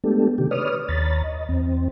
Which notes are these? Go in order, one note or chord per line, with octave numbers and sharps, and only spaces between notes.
G#3 A3 B3 D4 G4 A4
C3 D#3 G4
B4 C#5 D5 D#6 F6
D#2 C#5 A#5 B5 A6
D#5
E2 C4